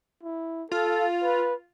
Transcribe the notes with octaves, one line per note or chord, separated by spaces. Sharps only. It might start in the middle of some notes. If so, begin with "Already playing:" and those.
E4
F4 A4
B4